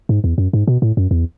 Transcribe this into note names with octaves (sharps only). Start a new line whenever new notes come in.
G#2
E2
F#2
G#2
B2
A2
F#2
E2